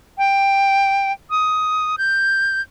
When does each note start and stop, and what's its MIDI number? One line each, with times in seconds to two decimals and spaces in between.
0.18 1.12 79
1.30 1.96 87
1.98 2.61 91